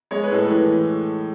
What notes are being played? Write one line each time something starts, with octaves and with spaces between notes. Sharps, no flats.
G#3 C#5
B4
A2 A4
E3 B4